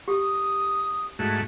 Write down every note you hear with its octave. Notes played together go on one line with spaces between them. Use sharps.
G4 D#6
G#2 A3 F#4